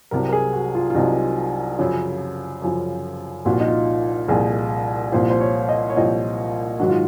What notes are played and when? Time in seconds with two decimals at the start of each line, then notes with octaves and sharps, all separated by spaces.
0.11 C2 C3 F#3 A#4
0.29 A#4
0.33 G#4
0.53 F#4
0.75 F4
0.90 F4
0.95 C2 C3 F#3 D#4
1.79 F#2 C#3 F3
2.62 F#2 C#3 F3
3.45 C2 A#2 F3 F#4
3.52 F4
3.60 D#4
3.67 F4
4.28 C2 A#2 F3 G#4
5.12 C2 A#2 F3 C5
5.30 C5
5.41 C#5
5.69 D#5
5.90 C#5
5.96 C2 A#2 F3 D#5
6.80 G#2 D#3 F#3 F#4
6.89 F4